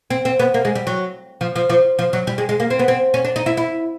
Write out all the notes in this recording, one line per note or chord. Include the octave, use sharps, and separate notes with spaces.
C4
C4
B3
A#3
G#3
G3
F#3
F3
F3
F3
F3
F#3
G3
G#3
G#3
A#3
C4
B3
C4
C#4
D4
D#4
E4
E4